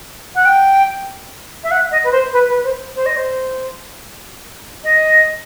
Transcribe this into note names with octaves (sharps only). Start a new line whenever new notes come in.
F#5
G5
E5
F#5
D#5
B4
C5
B4
B4
C5
C5
D#5
C5
D#5